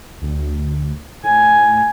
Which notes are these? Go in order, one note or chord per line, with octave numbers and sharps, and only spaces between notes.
D2
A2 G#5